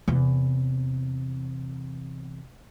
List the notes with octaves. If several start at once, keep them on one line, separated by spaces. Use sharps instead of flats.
E2 C3